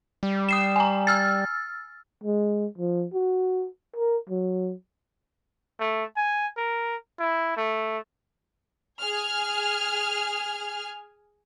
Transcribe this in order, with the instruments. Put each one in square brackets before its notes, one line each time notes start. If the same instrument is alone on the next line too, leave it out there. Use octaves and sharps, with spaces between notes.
[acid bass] G3
[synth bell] D#6 C7 E7
G#5 A#5
E6 F6 A6
[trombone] G#3
F3
F#4
A#4
F#3
[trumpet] A3
G#5
A#4
E4
A3
[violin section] G#4 G#5 F6